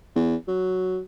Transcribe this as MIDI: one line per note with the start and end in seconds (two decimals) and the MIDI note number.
0.16 0.35 40
0.48 1.00 54